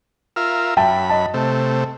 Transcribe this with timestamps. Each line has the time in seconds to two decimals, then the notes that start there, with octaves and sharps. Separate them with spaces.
0.36 F4 A#4 E5
0.77 F#2 E5 G5 A5 B5
1.10 D#5 A5
1.34 C3 A3